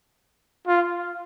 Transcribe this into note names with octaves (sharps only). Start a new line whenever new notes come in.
F4